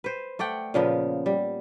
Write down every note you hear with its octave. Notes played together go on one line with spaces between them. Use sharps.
B4 C5
A3 D5 F#5 G5
A#2 C#3 F3 B3
G3